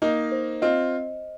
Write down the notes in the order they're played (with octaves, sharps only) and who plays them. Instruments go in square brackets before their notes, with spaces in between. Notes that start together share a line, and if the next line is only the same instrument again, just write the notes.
[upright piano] A#3 D#4 [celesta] D#5
[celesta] C5
[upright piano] C4 F4 [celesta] D#5